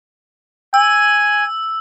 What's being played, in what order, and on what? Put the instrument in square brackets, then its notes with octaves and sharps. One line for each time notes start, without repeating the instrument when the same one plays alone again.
[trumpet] G#5 [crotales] E6